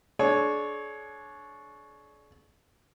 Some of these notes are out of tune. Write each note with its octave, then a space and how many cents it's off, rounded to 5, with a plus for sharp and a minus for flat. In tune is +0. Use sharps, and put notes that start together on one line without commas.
D4 +0 G#4 +45 C#5 +0